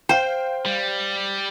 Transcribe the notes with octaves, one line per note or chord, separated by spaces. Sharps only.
C5 F5 G5
G3